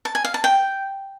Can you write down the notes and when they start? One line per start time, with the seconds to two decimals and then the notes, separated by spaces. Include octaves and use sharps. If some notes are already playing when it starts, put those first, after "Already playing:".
0.05 A5
0.15 G#5
0.25 F5
0.34 A5
0.44 G5